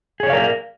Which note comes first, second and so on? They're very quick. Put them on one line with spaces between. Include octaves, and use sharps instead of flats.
G#4 C#5 D5 F5 A#4